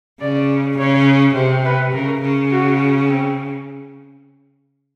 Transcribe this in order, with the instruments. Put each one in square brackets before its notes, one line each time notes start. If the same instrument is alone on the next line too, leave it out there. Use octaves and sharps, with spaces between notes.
[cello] C#3 [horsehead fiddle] D5
[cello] C#3 [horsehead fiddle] C#5
[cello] C3 [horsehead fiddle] C5
[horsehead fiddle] B4
[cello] C#3 [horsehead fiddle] A#4
[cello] C#3
[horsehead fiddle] F#4
C4